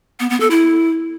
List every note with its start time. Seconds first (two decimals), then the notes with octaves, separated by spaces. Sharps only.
0.20 B3
0.30 B3
0.40 A4
0.50 E4